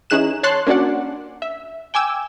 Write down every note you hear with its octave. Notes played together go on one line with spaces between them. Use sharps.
E3 C#4 D#4 G#4 F#6 E7
C#5 A5 C6 F#6
A#3 C#4 D4 F#4 D5 F#5
E5
G5 G#5 D6 E6